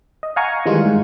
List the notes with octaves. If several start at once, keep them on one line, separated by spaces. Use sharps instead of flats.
D#5
F5 F#5 G#5 A#5 C#6
D#3 E3 G3 G#3 D#4 F4
G#2